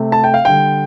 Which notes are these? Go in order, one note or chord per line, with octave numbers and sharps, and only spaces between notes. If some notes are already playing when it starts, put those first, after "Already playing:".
Already playing: C3 A3
A5
G5
F5
D3 G3 G5